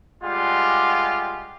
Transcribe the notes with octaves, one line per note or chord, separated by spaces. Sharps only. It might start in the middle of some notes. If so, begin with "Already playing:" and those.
G3 G#3 F4 G4 F#5